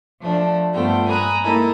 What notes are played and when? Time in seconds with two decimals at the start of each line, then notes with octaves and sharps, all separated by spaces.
0.20 F3 A3 D4
0.74 G2 A3 B3 F4 C5 G5
1.07 G#5 A#5 B5 D#6 F#6
1.42 G#3 A#3 D#4 E4 A4 A#4